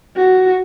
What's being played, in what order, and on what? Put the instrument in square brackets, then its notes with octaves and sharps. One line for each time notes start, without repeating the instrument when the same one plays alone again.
[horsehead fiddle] F#4